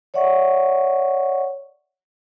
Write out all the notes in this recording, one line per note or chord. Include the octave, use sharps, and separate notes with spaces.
C#5 D5 E5 F#5 C#6